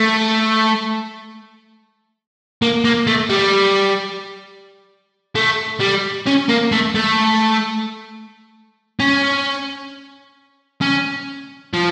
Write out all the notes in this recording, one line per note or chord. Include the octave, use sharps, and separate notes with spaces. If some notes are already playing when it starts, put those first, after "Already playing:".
Already playing: A3
A#3
A#3
A3
G3
A3
G3
C#4
A#3
A3
A3
C#4
C#4
F3